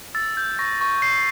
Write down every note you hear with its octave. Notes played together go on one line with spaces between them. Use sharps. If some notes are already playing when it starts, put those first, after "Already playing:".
E6 A6
G6
C#6 A#6
C#6
G6 C7